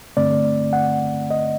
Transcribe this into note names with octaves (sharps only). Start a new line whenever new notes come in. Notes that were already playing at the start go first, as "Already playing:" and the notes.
G2 D3 A3 C4 D5
F#5
D#5